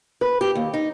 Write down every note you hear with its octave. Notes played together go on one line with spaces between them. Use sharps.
B4
G4
D#2
D#4